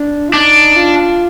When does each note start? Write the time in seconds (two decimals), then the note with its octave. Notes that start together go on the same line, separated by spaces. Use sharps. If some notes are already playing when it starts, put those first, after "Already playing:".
Already playing: D4
0.29 F4
0.33 D4 D#4
0.77 F4